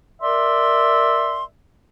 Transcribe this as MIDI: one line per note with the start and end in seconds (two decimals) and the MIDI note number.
0.21 1.43 70
0.21 1.43 74
0.21 1.43 76
0.21 1.43 84